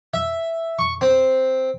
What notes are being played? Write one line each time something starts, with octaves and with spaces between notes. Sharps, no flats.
E5
C#6
C4